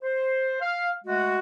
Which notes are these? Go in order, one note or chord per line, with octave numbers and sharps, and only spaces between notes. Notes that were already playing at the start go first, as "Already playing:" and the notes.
C5
F5
G#3 A3 F#4